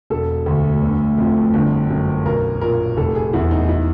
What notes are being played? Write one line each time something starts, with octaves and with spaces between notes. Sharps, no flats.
E1 A4
D2
G1
F2
G1
F#2
B1 A#4
A#2 A#4
F1 A4
G#4
E2 E4
D#4
E4